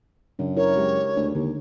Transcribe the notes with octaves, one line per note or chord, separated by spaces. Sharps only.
F#2 C#3 D4
E4 A#4 C#5
G#3 G4
D2
D#2 D3